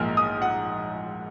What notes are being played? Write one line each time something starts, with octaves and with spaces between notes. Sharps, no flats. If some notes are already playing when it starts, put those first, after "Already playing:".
Already playing: A#1 G#2 F3 A#3 F6
D#6
F#5